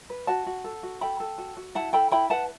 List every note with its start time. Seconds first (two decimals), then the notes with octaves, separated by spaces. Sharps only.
0.10 B4
0.27 F#4 F#5 A5
0.47 F#4
0.64 A4
0.83 F#4
1.01 A4 G5 B5
1.20 A4
1.38 F#4
1.57 F#4
1.75 E4 F#5 A5
1.93 A4 G5 B5
2.11 E4 G5 B5
2.30 B4 F#5 A5